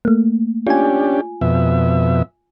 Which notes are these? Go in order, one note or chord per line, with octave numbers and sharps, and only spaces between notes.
A3 A#3
C#4 D4 F4 G4 G#5
F2 B2 E5